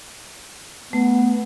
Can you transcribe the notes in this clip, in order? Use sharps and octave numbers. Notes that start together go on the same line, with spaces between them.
A3 B3